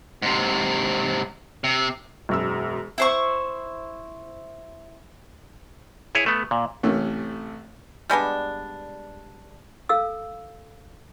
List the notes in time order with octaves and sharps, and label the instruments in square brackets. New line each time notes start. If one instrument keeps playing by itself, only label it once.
[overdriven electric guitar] G#2 C3
C3
[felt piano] E1 F#2 E6
[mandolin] E4 C5 C#6
[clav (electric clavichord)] E4 G#4 C#5
A3 B3
A#2
[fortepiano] A1 C3 A3 C#4
[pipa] G3 G#3 B3 D4
[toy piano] A4 F5 E6